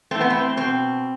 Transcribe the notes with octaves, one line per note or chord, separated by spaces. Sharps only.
E3 A3 C4
B3
C4
B2 C4